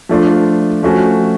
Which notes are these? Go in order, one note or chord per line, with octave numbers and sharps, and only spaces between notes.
F3 A3 D4 F4
F3 A3 C#4 F#4